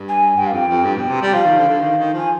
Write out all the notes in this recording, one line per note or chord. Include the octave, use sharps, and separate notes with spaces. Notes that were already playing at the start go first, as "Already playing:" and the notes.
Already playing: G2
G#5
G2 G5
F5
F2 G5
F2
G2
B2
C3
G3
F3 F5
D#3
D3
D3
D#3
D#3
F3 G#5